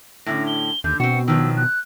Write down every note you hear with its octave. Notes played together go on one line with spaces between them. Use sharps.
A2 D3 C#4 A#6
G7
D#2 D3 G6
B2 C4 F#4 C#7
D#3 F3 F#3 E6
F#6